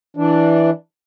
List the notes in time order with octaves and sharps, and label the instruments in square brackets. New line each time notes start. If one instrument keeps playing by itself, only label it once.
[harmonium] E3 D4